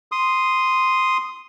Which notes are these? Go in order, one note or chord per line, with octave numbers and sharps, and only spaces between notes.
C6 D#6